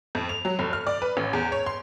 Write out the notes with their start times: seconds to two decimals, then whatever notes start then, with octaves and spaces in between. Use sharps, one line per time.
0.15 F2
0.29 F7
0.45 F#3
0.59 F1
0.73 F6
0.87 D5
1.02 B4
1.17 A1
1.33 E2
1.52 C#5
1.66 C6